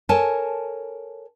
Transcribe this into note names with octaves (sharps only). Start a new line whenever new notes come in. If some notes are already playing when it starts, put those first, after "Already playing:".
A4 A#4 C#5 G#5 A5